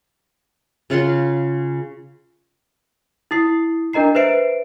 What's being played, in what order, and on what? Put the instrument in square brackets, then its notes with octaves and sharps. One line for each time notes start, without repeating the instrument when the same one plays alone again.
[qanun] C#3 F4 F#5 C6
[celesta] E4 D#6 C7
D4 A#4 D#5 A#5 C7
B4 C5 E5 C7 D7